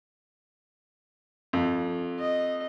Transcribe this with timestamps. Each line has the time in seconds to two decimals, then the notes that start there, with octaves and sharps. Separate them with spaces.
1.53 F2
2.19 D#5